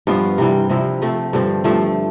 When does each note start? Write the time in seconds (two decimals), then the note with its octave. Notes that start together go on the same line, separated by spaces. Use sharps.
0.07 G2 F3 B3 F4
0.38 C3 E3 G3 C4
0.70 C3 F3 C4 E4
1.02 F3 A3 C4
1.33 G2 D3 F3 C4
1.64 G2 F3 A3